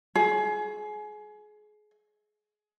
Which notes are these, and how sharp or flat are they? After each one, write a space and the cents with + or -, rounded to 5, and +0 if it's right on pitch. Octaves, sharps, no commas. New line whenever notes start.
G#4 +25